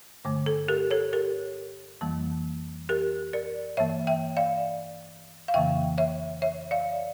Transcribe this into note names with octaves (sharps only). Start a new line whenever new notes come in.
G2 D3 A3
A4
G4 A#4
A4 C#5
G4 A#4
F2 E3 G3 A#3
G4 A#4
A#4 D5
G2 E3 A#3 C#5 E5
E5 G5
D5 F5
F5
F2 C#3 E3 A#3 E5 G5
C#5 E5
C#5 E5
D5 F5